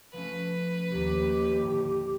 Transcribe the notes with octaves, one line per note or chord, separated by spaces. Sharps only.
F3 A3 C#4 B4
D#2 G4 C#5 D5 A#5
A2 D3